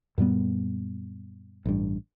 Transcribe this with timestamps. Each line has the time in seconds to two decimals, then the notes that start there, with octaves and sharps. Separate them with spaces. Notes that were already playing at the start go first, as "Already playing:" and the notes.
0.18 F#2 A#2 G3 B3
1.66 A1 G2